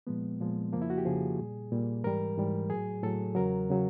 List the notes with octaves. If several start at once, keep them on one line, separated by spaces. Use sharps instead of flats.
A#2 F3 G#3 B3
A#2 F3 G#3
F2 C#3 F3 A#3
E4
F#4
G4
F2 C#3 F3 G#4
A#2 G3
A#2 G3
G#2 E3 G3 A#4
G#2 E3 G3
A2 F#3 G#4
A2 F#3 A4
E2 C#3 F#3 A#4
C#3 F#3